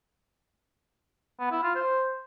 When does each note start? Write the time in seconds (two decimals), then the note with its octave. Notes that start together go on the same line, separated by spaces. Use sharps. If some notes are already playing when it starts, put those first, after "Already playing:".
1.40 B3
1.51 E4
1.63 F4
1.75 C5